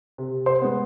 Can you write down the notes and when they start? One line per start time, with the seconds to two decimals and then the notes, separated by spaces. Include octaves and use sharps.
0.18 C3
0.46 C5 C6
0.62 G#3 B3